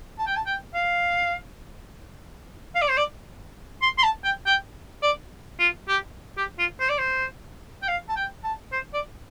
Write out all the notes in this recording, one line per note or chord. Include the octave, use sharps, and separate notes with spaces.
A5
G5
A5
G5
F5
F5
D5
C5
D5
C6
C6
A5
G5
G5
D5
F4
G4
G4
F4
C5
D5
C5
G5
F5
A5
G5
A5
C5
D5